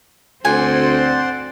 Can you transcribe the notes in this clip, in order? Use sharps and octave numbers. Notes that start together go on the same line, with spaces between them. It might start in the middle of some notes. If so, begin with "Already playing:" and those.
D2 C4 C5 D5 F#5 G#5 C6